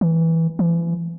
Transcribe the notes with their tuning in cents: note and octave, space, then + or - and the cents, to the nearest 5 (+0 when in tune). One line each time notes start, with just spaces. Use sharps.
E3 -10
E3 +35